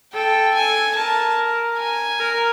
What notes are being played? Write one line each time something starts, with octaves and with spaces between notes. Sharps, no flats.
A4 G5
G#5
A#4 A5
G#5
A#4